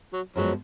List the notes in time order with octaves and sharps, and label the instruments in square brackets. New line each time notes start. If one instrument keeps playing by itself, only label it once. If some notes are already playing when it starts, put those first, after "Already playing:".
[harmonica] F#3
[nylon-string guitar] F#2 F3 G#3 B3 [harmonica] F#3